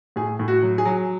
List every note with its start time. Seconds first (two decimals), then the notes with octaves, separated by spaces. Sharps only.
0.16 A2 G#4
0.39 A2
0.48 F#4
0.63 F#3
0.78 G#4
0.85 F#3